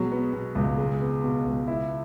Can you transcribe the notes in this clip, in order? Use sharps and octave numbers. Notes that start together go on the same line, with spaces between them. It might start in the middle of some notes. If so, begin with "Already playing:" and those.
Already playing: B2 F#3 G#3
B3
B2
C#2
G#3
B3
B2
C#2
E4